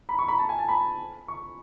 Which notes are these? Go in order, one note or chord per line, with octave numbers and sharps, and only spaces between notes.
B5
C#6
B5
A5
G#5
A5
B5
C#6